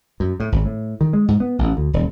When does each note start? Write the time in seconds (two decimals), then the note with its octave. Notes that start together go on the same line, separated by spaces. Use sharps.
0.20 F#2
0.40 A2
0.52 G#1
0.65 A2
1.01 D#3
1.13 G#3
1.28 G#2
1.40 B3
1.59 A1
1.77 D2
1.93 D#1